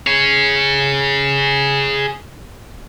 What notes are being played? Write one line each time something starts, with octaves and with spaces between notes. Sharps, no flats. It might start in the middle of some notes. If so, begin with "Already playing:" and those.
G#4 C#5